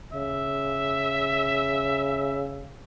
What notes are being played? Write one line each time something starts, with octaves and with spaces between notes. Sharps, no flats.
C#3 E5